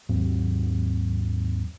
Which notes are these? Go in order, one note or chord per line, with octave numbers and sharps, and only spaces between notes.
D#2 G#2 F#3 C4